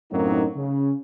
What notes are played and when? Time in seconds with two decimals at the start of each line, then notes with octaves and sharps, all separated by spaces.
0.11 F#2 A2 F#3 A#3 C4 D#4
0.56 C#3